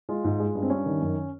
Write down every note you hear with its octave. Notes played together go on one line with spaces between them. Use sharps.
G#3 F4
G#2
G#3
G2
C4
G2 C#4
D#3
F#2